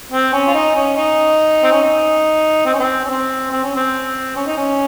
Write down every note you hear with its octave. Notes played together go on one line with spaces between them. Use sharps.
C4
C#4
F4
D#4
C#4
D#4
C4
C#4
D#4
C4
C#4
C4
C#4
C4
C4
C#4
C4
C#4
D#4
C#4